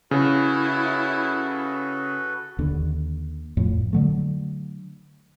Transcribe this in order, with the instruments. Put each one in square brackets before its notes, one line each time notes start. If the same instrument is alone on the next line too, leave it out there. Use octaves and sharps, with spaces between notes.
[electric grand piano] C#3 [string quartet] E4 [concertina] F#4 A4 B4
[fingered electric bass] D#2 D3
F2 A2
D3 F#3 A3